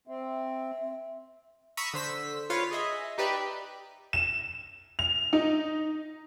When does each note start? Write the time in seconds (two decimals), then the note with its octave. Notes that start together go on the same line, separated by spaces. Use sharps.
0.08 C4 E5
1.77 A#5 B5 C#6 D#6 E6 B6
1.94 D3 C5 E6 B6
2.50 F4 B4 C#5 F5
2.71 G#4 D#5 E5
3.18 D#4 G4 B4 D5 E5
4.13 E7
4.99 F7
5.33 D#4